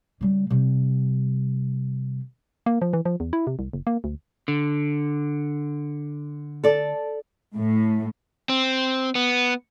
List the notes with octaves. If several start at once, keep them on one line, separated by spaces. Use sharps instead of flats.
C#3 G3
C3 G3
A#3
F3
E3
F3
E2
E4
C3
C2
F#1
A#3
D2
D3
A4 D5
A2
C4
B3